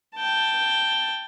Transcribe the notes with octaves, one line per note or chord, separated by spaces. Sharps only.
G5 A5